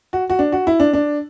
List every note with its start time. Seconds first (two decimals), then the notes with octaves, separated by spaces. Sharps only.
0.13 F#4
0.30 F#4
0.39 D4
0.52 F#4
0.67 E4
0.80 D4
0.93 D4